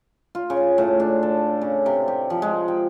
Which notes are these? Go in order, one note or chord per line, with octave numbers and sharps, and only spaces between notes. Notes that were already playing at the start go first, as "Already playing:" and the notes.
F4
C#3
A2
D4
A4
C#3
C3
G4
F3
G#3
G5